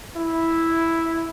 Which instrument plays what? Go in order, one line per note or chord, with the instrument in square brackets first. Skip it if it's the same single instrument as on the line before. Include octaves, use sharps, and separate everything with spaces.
[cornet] E4